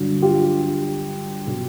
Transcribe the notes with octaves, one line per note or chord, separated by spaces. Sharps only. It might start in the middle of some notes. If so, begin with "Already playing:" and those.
Already playing: G2 D3 F#3
F4 G4
B2 F#3